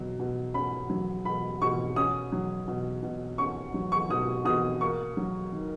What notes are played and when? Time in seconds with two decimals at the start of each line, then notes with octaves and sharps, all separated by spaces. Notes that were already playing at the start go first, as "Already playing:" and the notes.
Already playing: B2 F#3
0.19 B2
0.54 C#4 B5
0.90 F#3
1.25 B2 B5
1.61 B2 C#6
1.96 C#4 D#6
2.32 F#3
2.68 B2
3.03 B2
3.38 C#4 C#6
3.74 F#3
3.92 C#6
4.10 B2 D#6
4.45 B2 D#6
4.81 A#3 C#6
5.17 F#3
5.52 D#3